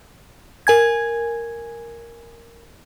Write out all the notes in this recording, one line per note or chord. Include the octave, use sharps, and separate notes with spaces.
A#4 G#5 G#6